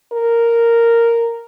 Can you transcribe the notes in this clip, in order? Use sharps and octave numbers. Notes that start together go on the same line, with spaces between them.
A#4